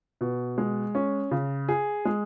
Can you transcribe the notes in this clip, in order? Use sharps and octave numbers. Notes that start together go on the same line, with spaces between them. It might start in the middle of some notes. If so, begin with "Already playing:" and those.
B2
G#3
C#4
C#3
G#4
G#3